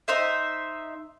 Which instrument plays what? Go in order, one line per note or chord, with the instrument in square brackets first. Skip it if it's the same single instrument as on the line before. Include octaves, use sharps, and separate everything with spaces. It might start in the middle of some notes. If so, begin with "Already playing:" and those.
[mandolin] D#4 C5 E5